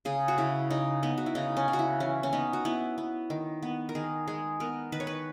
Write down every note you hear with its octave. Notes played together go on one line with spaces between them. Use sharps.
C#3 G#4
F#4
C#3 E4
C#3 D#4
B3 D#4
F#4
E4
C#3 D#4
C#4
C#3
F#4
E4
E3 C#4
C#4
B3 D#4
F#4
B3 E4
B3
D#3
B3
A#4
D#3 G#4
G#3 G#4
B3 A#4
D#3 B4
C#5
B4